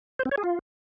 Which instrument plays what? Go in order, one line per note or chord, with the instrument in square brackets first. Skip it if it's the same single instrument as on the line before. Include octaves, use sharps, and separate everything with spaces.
[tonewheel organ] C5
C4
C#5
G#4
F4